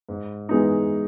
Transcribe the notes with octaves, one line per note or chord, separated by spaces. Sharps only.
G#2
E3 G#3 B3 D#4